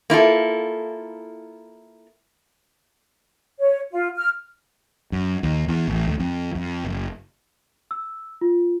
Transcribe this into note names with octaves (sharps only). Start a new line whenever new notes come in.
A#3 E4 F4 A4
C#5
F4
F6
F#2
D#2
E2
A1
D2
F2
F2
F#1
E6
F4